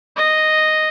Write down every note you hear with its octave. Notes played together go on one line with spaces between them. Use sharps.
D#5